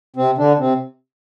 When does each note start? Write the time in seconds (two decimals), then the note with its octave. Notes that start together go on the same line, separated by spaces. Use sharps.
0.16 C3 C4
0.38 D3 D4
0.59 C3 C4